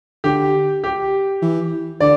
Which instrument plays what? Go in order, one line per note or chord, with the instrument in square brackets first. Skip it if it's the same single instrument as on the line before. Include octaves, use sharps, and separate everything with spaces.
[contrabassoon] D3 [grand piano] G4
[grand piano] G4
[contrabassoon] E3
[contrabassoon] D3 [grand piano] D5